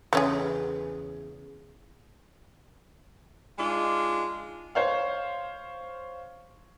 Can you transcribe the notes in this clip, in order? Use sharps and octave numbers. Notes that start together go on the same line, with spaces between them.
E2 C#3 A3 C#4 G#4 B4
G#3 D4 D#4 F4
C5 C#5 F5